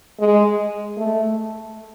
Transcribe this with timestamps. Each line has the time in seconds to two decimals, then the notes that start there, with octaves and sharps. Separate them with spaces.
0.19 G#3
0.97 A3